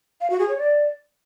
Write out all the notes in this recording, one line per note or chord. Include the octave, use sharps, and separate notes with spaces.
F5
F#4
G#4
C#5
D5